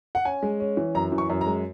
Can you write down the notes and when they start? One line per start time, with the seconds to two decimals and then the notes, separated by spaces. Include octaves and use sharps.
0.15 F#5
0.25 C#4 G#5
0.43 G#3
0.60 C#4
0.77 E3
0.95 F#2 A#5
1.12 E3
1.18 C#6
1.30 F#2
1.41 A#5
1.46 G#3